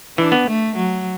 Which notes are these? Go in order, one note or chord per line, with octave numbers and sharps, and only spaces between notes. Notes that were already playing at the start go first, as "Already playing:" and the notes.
E3 D4
B3
A3
F#3